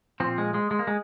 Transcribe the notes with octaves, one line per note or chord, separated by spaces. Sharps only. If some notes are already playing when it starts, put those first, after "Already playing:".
F3 C4
A#2
G#3
G#3
G#3
A#3
G#3